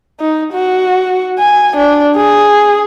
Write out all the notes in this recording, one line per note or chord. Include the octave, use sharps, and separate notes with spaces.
D#4
F#4
G#5
D4
G#4